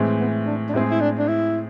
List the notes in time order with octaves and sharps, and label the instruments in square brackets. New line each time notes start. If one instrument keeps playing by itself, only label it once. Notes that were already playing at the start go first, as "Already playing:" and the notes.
Already playing: [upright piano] A2 E3 G#3 C4
[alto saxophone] B3
D4
D4
[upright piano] A2 G#3 C4 G#4 [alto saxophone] E4
[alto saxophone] E4
D4
D4
E4